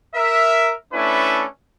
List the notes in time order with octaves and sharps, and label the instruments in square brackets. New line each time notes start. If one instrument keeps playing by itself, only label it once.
[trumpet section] A#4 E5
A3 C#4 D4 E4 B4